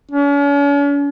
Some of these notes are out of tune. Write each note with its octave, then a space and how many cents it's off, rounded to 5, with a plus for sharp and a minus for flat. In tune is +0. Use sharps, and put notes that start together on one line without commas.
C#4 +45